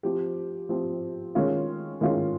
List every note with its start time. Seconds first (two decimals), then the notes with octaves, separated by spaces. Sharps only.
0.03 F3 C4 G4
0.69 F3 C4 G4
1.35 D#3 G#3 C#4 F4
2.01 D#3 G#3 C#4 F4